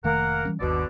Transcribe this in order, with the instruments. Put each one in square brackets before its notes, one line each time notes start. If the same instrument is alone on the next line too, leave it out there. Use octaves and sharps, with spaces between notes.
[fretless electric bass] F1 D#3 A3 [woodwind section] A#3 A#4 F#5
[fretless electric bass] E3 G3 C#4
[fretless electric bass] G1 D#2 [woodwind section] B2 D3 D5